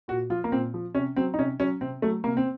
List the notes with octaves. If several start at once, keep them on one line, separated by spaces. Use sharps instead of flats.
A#2 F#4
F3 F4
A#3
A#2 C4
F3
C3 C#4
F#3 C4
D#4
C3 C#4
F#3 C#4
C3 C4
F#3 A3
C3 A#3
C4